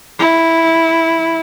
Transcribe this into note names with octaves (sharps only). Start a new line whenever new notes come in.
E4